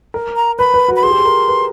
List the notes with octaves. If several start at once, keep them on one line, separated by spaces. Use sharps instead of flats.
A#4
A#5
B4 B5
B4
F#4
B5
G#4 C6
G4
G#4
A#4
B4